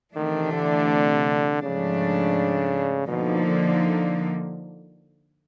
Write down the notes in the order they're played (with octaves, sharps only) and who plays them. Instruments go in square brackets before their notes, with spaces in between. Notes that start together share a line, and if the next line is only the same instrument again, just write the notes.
[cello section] C3 E3 A3 D4 [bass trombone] D#3
[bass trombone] D3
[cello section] G#2 F3 A3 D4 [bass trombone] C#3
[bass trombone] B2 [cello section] D3 F3 A#3 D#4